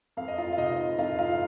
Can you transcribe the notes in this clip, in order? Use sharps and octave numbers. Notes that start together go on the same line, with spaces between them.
F2 F5
D#5
F4 F5
F5
C3 D#4 D#5
F2 F4 F5
F4 F5